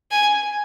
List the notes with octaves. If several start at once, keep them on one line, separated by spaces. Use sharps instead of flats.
G#5